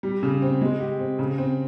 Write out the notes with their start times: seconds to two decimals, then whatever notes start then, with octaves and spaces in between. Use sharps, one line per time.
0.03 G3
0.23 C#3
0.42 C4
0.61 G#3
0.80 G4
0.99 C4
1.19 C#3
1.38 C4